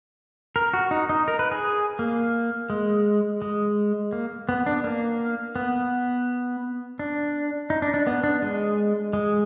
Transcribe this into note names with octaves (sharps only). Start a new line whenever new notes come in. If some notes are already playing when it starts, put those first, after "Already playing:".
A#4
F#4
D#4
D#4
A#4
B4
G#4
A#3
G#3
G#3
A#3
B3
D4
A#3
B3
D4
D#4
D4
D4
B3
D4
G#3
G#3